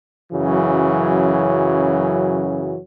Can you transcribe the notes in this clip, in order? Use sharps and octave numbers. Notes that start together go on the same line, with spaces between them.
F#2 C#3 E3 F#3